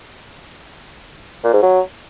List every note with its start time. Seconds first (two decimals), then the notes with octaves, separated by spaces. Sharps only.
1.44 A#2
1.53 G#2
1.62 F#3